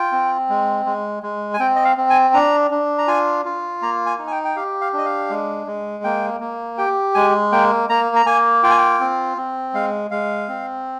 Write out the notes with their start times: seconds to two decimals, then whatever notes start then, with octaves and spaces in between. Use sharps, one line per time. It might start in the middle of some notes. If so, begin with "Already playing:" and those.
Already playing: F4 G5
0.12 C4
0.49 G#3
0.86 G#3
1.23 G#3
1.54 G#5
1.60 C4 G5
1.76 D#5
1.85 F5
1.97 C4
2.10 G#5
2.34 D4 A#5
2.71 D4
2.98 A#5
3.08 F4 G#5
3.45 F4
3.82 A#3 A#5
4.06 G#5
4.19 D#4
4.27 G#5
4.31 G5
4.45 G5
4.56 G4 F5
4.81 F5
4.93 D4 D#5
5.05 F5
5.30 G#3
5.67 G#3
6.04 A#3 G5
6.41 A#3
6.78 G4 G5
7.15 G#3 G#5
7.52 A#3 G5
7.89 A#3 A#5
8.16 A#5
8.26 A#3 G#5
8.63 F4 G5
8.70 G#5
8.78 G5
9.00 C4
9.37 C4
9.74 G#3 F5
10.11 G#3 F5
10.48 C4